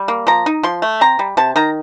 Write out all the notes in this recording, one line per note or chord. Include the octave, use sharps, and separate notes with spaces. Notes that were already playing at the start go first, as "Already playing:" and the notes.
Already playing: G3
A#3
F3 A#5
D#4
F3 C6
A3
C4 A#5
G3
C3 A5
D#3 A#5